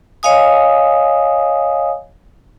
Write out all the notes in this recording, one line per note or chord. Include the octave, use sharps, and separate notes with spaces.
C#5 D#5 F5 G#5 D#6